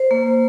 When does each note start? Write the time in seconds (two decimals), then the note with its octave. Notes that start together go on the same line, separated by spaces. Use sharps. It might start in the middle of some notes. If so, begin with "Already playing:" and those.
Already playing: C5
0.11 A#3